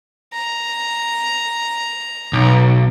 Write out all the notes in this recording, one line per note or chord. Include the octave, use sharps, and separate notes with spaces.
A#5
B1